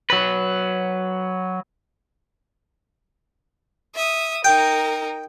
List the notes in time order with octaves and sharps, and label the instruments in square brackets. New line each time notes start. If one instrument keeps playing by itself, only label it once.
[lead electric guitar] F#3 B4
[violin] E5 D#6
[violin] D#4 A#4 [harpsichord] G5